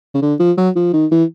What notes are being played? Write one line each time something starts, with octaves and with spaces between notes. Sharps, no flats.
C#3
D3
F3
F#3
F3
D#3
E3